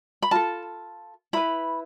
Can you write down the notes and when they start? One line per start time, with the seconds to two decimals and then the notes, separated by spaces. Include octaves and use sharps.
0.22 B5
0.31 F4 A4 A5
1.33 E4 B4 B5